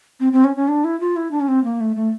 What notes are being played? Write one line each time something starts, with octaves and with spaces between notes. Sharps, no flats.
C4
C4
C#4
C#4
D4
E4
F4
E4
D4
C#4
C4
A#3
A3
A3